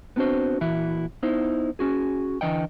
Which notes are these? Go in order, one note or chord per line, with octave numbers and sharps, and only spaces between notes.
B3 C4 D4 F#4 C5
A#2 E3 E4 F#4
B3 D#4 E4 C5
C#4 F#4 G#4
D3 E3 D#5 G5